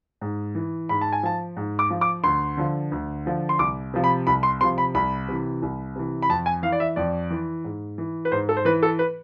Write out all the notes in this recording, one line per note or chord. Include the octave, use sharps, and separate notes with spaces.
G#2
E3
G#2 B5
A5
G#5
F3 A5
G#2
D6
F3
D6
D2 C6
D3 F3
D2
D3 F3
C6
C2 D6
C3 F3
B5
C2 B5
C6
C3 F3 C6
B5
C2 B5
C3 E3
C2
C3 E3
B5
F2 A5
G#5
E3 F5
D5
E5
F2 D5
E3
G#2
E3
B4
G#2 C5
A4
C5
E3 B4
A4
B4